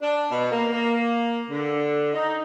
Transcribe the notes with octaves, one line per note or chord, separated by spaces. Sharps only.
D4
B2
A#3
A#3
D3
D#4